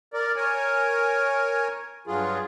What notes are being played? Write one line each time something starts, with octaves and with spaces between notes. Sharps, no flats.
A#4 D5
A#4 C#5 G#5
G2 F#3 F4 G#4